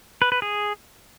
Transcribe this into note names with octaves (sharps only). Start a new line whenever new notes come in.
B4
B4
G#4